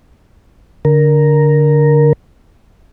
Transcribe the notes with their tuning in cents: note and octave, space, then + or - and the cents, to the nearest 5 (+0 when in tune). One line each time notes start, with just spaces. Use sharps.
D3 -10 A#4 +0